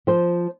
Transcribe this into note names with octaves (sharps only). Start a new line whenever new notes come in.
F3 C5